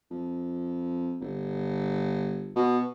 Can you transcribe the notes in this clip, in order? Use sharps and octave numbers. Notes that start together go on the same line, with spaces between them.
F2
G1
B2